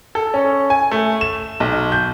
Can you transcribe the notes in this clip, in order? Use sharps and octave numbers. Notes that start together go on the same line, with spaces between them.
A4
C#4
G#5
A3
E7
B1
G6